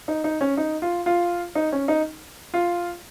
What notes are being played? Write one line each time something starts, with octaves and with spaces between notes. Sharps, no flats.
D#4
D#4
C#4
D#4
F4
F4
D#4
C#4
D#4
F4